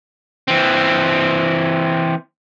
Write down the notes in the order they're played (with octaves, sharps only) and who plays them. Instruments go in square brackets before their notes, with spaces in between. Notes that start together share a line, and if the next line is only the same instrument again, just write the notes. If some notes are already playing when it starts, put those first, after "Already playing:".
[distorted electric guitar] E3 C4